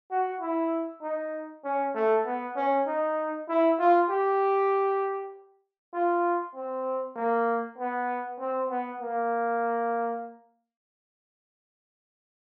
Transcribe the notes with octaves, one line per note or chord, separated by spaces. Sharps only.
F#4
E4
D#4
C#4
A3
B3
C#4
D#4
E4
F4
G4
F4
C4
A#3
B3
C4
B3
A#3